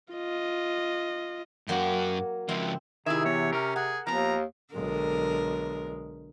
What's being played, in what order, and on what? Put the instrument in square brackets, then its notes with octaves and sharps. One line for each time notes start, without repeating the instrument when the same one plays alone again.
[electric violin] F4 D#5
[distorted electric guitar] F#2 F#4 [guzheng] F#3 A#3 G5
[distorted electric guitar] C#2 F3 [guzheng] C4 E4
[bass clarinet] C3 [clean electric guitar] D#3 [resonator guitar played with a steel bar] E4 E5 [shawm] G#4
[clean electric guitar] E2 [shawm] C#5
[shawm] C#4 [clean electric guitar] A#4
[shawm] G#4 [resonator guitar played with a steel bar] F#5
[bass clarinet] D#2 [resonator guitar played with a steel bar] F3 B3 [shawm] A#5
[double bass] B1 G#3 [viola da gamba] D3 A#4